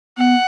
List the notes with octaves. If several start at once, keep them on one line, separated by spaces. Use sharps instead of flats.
B3 F#5